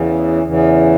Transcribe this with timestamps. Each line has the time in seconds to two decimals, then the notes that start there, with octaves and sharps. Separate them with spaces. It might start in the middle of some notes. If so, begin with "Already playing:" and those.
Already playing: E2 C#3 E3
0.44 E2 C#3 E3